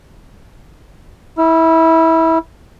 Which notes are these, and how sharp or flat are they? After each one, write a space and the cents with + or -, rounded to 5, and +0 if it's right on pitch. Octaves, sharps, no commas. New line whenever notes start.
E4 -20 E6 +35